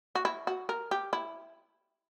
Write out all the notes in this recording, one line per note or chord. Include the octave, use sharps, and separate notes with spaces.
F#4
E4
F#4
A#4
G4
E4